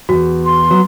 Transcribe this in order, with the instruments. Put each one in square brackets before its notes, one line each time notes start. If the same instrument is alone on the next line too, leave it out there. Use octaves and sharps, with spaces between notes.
[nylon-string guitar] E2 G2 [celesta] F#4
[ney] C6
[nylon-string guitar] F#3 B3